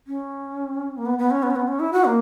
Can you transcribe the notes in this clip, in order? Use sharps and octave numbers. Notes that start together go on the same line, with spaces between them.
C#4
A#3
B3
B3
C#4
B3
C#4
B3
C#4
E4
F#4
A#3